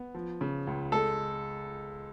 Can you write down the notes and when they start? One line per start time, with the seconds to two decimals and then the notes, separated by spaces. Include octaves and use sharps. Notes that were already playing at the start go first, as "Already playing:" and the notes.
Already playing: B3
0.15 F3
0.41 C#3
0.67 C#2
0.92 G#3 A4